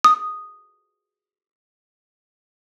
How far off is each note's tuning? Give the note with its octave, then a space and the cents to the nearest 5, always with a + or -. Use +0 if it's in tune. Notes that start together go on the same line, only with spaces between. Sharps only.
D#6 -5